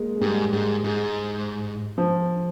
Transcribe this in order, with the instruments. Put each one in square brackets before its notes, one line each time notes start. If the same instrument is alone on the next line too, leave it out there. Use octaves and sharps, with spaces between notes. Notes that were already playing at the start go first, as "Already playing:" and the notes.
Already playing: [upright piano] G#3 A#3
G#3
[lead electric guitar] G#2 [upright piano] G3
[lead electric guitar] G#2 [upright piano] G#3
[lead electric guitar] G#2 [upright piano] G#3
[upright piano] F3